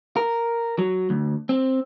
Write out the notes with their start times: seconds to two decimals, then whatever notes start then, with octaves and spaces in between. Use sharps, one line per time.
0.17 A#4
0.79 F#3
1.10 D2
1.49 C4